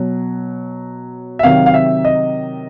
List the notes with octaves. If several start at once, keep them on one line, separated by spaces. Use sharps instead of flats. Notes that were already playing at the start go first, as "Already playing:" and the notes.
Already playing: B2 F#3
E5
C3 D#3 F#3 F5
F5
E5
D#5